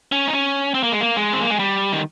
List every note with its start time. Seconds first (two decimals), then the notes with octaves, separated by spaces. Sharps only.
0.12 C#4
0.27 D#4
0.33 C#4
0.74 C4
0.83 A#3
0.92 G#3
1.00 A#3
1.17 G#3
1.33 C4
1.41 A#3
1.50 G#3
1.59 G3
1.92 D#3